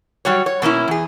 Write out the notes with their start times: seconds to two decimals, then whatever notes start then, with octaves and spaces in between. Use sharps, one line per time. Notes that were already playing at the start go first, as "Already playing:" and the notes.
0.25 F#3 G3 F#4 C#5
0.46 C#5
0.62 B2 A#3 C#4 E4
0.88 E2 G#4